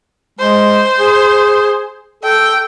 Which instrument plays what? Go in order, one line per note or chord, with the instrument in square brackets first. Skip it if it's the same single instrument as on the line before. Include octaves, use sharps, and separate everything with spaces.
[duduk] G#3 [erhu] C5
[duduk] G#4
[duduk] A4 [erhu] G5